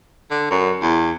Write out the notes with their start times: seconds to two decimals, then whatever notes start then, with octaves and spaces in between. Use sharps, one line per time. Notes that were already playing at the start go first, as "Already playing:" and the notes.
0.31 D3
0.51 F#2
0.82 E2